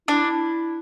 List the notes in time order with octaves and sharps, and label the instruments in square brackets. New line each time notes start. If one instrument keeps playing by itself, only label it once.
[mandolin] D4 [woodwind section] E4